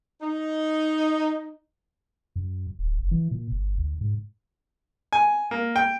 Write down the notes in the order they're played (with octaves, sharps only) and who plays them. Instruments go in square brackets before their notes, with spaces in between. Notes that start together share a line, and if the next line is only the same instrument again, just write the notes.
[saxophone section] D#4
[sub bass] F#2
D1
F#1
E3
A#2
G1
D2
G#2
[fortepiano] G#5
A#3
G5